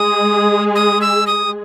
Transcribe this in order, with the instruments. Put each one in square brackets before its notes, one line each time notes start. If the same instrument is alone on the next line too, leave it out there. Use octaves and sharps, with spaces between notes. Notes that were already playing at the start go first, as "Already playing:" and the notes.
Already playing: [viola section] G#3 G#4 [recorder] D#6
[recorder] D#6
E6
D#6